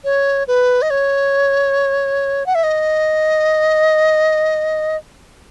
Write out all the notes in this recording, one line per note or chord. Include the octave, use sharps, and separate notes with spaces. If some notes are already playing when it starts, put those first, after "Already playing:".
C#5
B4
D#5
C#5
F#5
E5
D#5